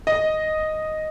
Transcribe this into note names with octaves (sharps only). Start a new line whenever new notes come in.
D#5